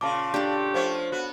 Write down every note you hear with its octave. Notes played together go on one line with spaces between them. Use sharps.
A#2 C#3 F5 A5 D6
D4 G4 A4
F3 A3 C5 C#5
B3 F#4